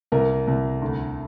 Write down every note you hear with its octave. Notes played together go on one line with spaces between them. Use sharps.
C2 A#4
C2
D2